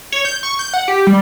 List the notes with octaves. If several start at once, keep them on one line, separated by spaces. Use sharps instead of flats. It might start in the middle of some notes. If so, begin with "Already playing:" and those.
C#5
G6
C#6
G6
F#5
G4
G3